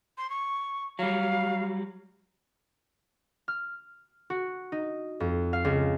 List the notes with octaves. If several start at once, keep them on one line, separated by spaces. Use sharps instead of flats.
C6
C#6
F#3 G3 F5
F6
F#4
D#4
F2
F5
C#2